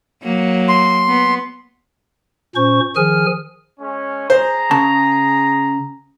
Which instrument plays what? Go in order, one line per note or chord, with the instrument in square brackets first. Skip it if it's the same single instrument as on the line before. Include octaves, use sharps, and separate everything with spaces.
[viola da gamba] F#3 A#3
[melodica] C6
[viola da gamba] B3
[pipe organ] A#2 C#4 C5 C#6
D#3 F3 G#4 G#5 F6
[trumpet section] G#3 C#4
[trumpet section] G#4 A#5 [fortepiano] C5
[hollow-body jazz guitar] C#3 A5